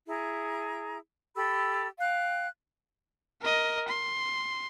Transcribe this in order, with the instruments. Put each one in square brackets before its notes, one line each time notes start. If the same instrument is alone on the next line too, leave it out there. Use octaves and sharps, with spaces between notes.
[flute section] E4 G#4 A#5
G4 A4 B5 E6
F5 G5 F#6
[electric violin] A#4 D#5
C6